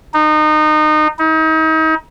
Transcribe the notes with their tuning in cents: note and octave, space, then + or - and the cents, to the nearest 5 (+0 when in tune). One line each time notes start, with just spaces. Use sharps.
D#4 -25
D#4 +35